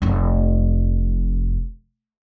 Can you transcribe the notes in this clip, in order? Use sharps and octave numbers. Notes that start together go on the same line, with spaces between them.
F1 F2